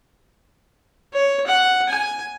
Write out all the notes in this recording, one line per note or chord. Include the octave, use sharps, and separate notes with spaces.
C#5
F#5
G#5